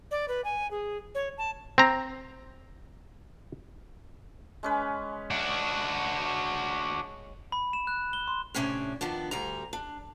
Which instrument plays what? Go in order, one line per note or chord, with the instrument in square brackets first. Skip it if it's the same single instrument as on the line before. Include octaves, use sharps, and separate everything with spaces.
[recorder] D5
B4
G#5
G#4
C#5
A5
[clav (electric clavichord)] C4 A#5
[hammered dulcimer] G#3 C#4 B4
[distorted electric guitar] D4 F#4
[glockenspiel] B5
E7
F#6
G7
C6
[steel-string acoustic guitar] A2 C3 C#4 D4
D#3 F3 B3 D4
D2 G3 A#5
D4